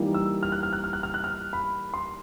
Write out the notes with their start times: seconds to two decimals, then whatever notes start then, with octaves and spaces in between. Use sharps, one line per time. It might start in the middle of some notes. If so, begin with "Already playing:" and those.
Already playing: E3 G3 A#3 D#4
0.14 E6
0.43 F6
0.52 F#6
0.63 F6
0.73 F#6
0.84 F6
0.93 F#6
1.03 F6
1.14 F#6
1.24 F6
1.53 B5
1.94 C6